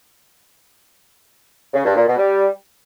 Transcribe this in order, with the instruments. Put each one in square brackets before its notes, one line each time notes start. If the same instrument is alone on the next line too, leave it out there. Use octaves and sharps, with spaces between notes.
[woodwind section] C#3
G2
A#2
B2
G3